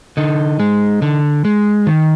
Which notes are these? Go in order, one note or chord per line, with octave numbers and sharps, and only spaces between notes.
D3 D#4
G#3
D3
G#3
D#3